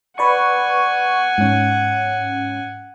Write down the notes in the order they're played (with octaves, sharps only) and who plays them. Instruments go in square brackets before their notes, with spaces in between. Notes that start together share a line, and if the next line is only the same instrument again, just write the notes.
[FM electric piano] B4 D5 C#6 [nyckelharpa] F#5 G#5
[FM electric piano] G#2 C#4